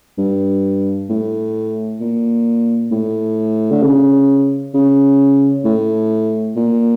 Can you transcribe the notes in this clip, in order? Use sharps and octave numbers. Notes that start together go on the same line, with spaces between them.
G2
A2
A#2
A2
D3
C#3
C#3
A2
A#2